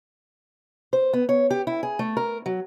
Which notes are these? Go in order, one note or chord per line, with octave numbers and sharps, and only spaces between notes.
C5
B3
C#5
G4
E4
G#4
A3
A#4
F#3